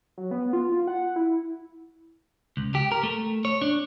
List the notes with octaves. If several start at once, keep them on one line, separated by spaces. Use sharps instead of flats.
F#3
B3
F4
F4
F#5
E4
C#2
G4
A#4
A3
C#5
D4